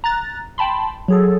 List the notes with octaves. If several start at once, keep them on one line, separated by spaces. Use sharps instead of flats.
A#5 F#6 A6
G5 A5 B5 C6
F#3 G#4 A4